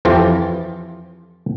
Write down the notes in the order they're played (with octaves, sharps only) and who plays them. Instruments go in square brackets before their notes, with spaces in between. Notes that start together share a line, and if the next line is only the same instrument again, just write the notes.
[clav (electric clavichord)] F2 E3 F3 F4 G4